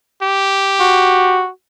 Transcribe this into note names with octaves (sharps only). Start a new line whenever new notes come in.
G4
F#4